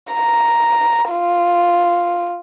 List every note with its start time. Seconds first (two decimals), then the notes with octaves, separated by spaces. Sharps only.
0.13 A#5
1.12 F4